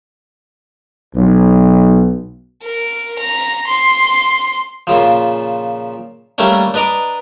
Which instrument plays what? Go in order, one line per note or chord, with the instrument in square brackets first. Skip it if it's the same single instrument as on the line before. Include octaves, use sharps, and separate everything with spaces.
[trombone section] B1
[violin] A#4
A#5
C6
[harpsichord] A#2 C#3 F3
G3 A3 A#3 C#4 D4
D4 B4 D#5 A#5 D6